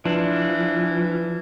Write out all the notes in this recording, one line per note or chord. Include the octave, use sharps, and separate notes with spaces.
E3 F3 D4